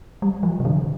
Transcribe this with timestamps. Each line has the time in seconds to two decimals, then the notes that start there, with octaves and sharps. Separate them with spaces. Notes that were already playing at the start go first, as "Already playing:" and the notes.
0.22 G3
0.43 F3
0.60 C3
0.65 D3